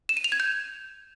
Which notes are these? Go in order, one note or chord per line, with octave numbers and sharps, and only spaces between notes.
E7
D#7
F7
G#6
G6